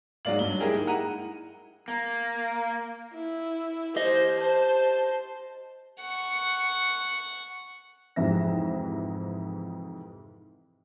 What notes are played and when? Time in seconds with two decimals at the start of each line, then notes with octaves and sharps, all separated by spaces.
0.25 G#2 F#3 G#3 D5 F5 F#7
0.39 G2 F#3 G7
0.60 G#3 A#3 E4 G4 G#4 A#4
0.74 D#4
0.87 E4 F#5 A#5 D#7
1.88 A#3
3.14 E4
3.96 G4 C5 D#5
4.38 C5 A5
6.00 F#5 C#6
8.16 F2 G#2 C3 E3 E5 A#6